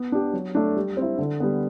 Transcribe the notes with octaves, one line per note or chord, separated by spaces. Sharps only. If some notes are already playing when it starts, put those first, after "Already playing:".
Already playing: B3
D4 G4
F#3
A3 D4
G3
C4 E4
D3
G3 B3